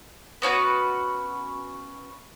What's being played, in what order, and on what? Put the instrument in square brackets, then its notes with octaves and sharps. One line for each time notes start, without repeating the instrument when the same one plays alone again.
[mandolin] B3 C#4 F#4 B4